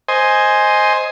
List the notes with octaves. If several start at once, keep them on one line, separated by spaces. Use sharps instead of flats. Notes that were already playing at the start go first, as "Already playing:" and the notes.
C5 D#5 G#5